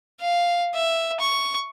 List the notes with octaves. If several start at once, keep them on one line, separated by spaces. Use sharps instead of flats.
F5
E5
C#6